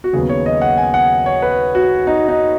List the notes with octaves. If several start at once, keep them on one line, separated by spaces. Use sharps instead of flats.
F#4
D#2 C#3 F#3 B3 G#4
C#5
D#5
F#5
G#5
F#5
C#5
B4
F#4
D#4
D#4